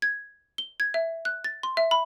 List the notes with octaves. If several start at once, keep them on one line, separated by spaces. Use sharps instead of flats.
G#6
G7
G#6
E5
F#6
A6
C6
E5
B5